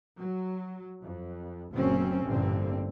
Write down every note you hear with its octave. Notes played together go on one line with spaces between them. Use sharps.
F#3
F2
F#1 D2 A#2 F#3 C4 C#4
A1 G2 A#2 D3 C4